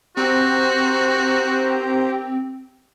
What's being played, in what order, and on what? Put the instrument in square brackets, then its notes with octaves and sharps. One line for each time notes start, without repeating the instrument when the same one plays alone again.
[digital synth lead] C4 [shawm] F#4 [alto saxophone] G4 [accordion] C5 A#5